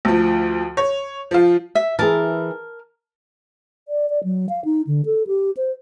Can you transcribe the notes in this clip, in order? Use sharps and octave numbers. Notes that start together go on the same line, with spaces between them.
D2 F3
C#5
F3 F4
E5
E3 E4 G#4 A#4 A5
D5
D5
F#3
F5
D#4
D3
A4
G4
C5